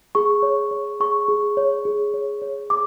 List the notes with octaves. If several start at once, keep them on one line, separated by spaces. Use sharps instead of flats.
G#4 C#6
C#5
C#5
G#4 C#6
G#4
C#5
G#4
C#5
C#5
G#4 D6